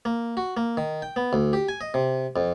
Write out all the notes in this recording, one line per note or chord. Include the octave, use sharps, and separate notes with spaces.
A#3
F#4
A#3
D#3
G5
B3
D2
G4
G#5
D#5
C3
F2